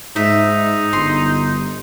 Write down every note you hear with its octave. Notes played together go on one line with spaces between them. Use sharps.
G#2 D#4 E5
G1 C6